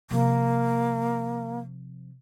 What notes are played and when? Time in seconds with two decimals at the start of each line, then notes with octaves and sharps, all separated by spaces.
0.11 C3 F3 A#3